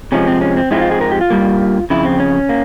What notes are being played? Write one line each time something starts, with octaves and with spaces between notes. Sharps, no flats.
C3 F3 G#3 C#4
C4
C#4
C4
G#2 F3 G#3 C4 E4
F4
G#4
A#4
G4
F4
G2 G3 A#3
F2 C#3 E4
C4
C#4
A#3